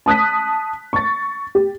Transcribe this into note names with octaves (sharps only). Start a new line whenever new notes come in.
A5 D#6 F#6 B6
C#6 A6
G4